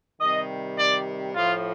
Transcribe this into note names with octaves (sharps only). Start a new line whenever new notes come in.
C3 D#3 G3 D#5
D5
A2 F3 F4